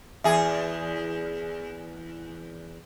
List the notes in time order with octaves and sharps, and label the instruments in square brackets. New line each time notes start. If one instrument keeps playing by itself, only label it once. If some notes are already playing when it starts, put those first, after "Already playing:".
[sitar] E2 G#4 [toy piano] E5 G#5